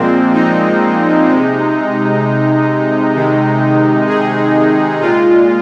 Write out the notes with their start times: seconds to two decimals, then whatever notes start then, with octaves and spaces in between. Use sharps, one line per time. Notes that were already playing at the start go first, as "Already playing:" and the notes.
Already playing: A#2 F3 G#3 A#3 C4
0.33 D#4
1.27 C3 G#3
3.13 C3 D#3 G#3
4.07 G#4
5.01 A#2 G#3 F4